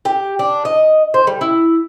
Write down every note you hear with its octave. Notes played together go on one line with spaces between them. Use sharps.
G4
D4
D#5
C5
G3
E4